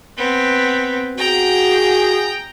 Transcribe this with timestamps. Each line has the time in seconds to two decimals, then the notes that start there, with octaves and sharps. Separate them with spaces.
0.17 B3 C4
1.18 F#4 G#4 G5 A#5